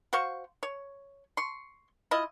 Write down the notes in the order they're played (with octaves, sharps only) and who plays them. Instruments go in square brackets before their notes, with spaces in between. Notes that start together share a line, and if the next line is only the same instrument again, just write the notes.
[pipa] F#4 C5 F5 C#6
C#5
C6 C#6
E4 F4 D#5